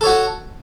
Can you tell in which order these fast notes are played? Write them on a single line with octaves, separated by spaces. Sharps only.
A4 C#5 F#4